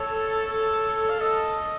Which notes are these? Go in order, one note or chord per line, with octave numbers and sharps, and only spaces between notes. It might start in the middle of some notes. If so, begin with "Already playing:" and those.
Already playing: A4 C#5
F5
A4 D#5